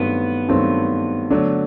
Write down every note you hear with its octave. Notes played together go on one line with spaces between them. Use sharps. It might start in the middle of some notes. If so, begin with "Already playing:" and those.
Already playing: G2 D#3 F#3 A3 B3 C4
G2 D#3 F#3 A3 C4
D3 F#3 A3 D4